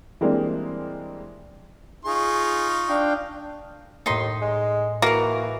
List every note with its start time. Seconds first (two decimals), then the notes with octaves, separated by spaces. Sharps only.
0.21 E3 G3 G#3 A#3 C4 D4
2.05 D#4 F4 G#4 C#6
2.89 D4 F5 G5
4.06 D#2 A2 D#4 C6 B6
4.42 G#3
5.02 E3 A#3 F#4 A#4